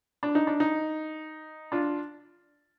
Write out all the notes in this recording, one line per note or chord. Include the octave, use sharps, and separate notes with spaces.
D4
D#4
D4
D#4
D4 F4